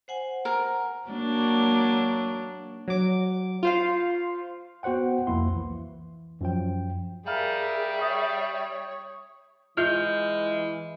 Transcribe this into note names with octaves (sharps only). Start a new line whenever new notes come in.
C5 F#5 G#5
A#4
F#3 A#3 D4
F#3 D6
F4 C5 F5
B3 F#4 C5 F#5 G5
C2 F2 A#3 E4 C6
E3
F#2 F3 G5
G3 G#4 A#4 E5 F5 A#5 F6
C#5 D#6
E3 G#3 F4 E5 F6 G6